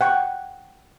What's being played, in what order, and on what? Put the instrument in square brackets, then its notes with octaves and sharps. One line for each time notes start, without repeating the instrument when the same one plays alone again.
[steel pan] F#5 G5 C#6